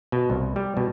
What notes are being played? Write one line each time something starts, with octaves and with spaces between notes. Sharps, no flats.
B2
C2
G3
B2